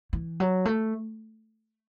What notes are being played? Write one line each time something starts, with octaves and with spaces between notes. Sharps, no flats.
E3
F#3
A3